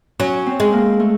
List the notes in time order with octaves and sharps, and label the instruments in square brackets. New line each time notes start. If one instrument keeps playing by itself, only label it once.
[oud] F#3 [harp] C#4
[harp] C4
[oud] G#3
[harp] A#3
A3